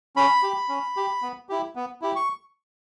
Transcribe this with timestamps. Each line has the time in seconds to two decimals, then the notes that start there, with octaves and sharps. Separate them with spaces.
0.16 C#4 B5
0.43 G4
0.69 C#4
0.97 G4
1.22 B3
1.49 E4 G4
1.75 B3
2.02 E4 G4
2.16 C#6